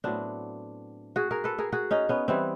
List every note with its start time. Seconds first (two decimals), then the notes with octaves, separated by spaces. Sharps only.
0.04 A2 F#3 B3 C4 D4
1.16 F#4 G#4
1.31 G#4 A#4
1.44 A4 B4
1.58 G#4 A#4
1.72 F#4 G#4
1.91 C#4 D#4
2.09 B3 C#4
2.28 E3 G3 B3 C4